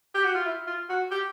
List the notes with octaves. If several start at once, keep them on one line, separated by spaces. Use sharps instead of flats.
G4
F#4
F4
E4
F4
F#4
G4